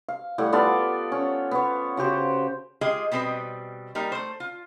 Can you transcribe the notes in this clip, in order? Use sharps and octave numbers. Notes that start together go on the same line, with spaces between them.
F5
A2 G3 F#5
B3 F4 A4 D5
C#4
B3 C#5
C#3 F#4 G4 C5
G#3 F4 G4 G#4 D#5
B2 G3 C4 B4 D#5
G3 A#3 D#4 A#4
A3 C5
F4